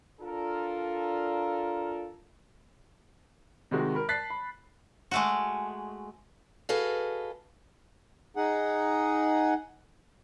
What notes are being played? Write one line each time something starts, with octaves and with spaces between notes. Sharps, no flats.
D4 F4 A4 A#4
C3 D#3 G#3 F#4
A#4 B5
A5 F#6 A6 B6 C7
B5
G#3 A3 F#4
F#4 G#4 A4 B4 D#5 F5
D#4 G#4 F#5